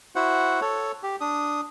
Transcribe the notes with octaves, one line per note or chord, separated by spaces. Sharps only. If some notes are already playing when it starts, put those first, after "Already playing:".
E4 F#4 C5 F#5
A4 C#5
G4
D4 D#6